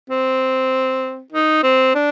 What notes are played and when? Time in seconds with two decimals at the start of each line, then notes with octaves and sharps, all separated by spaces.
0.10 C4
1.32 D#4
1.63 C4
1.95 D4